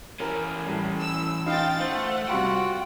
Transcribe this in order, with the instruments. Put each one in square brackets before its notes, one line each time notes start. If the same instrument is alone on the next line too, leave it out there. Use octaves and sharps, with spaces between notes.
[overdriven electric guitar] E3 C#4 [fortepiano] A#4
[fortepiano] A2 G3
[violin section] E6
[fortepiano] D#4 [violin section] F4 G5 A6 [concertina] F5
[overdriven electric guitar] A3 [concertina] C5 [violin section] F#5
[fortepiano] C3 G3 B5 [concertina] F4 F#4 [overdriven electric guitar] G5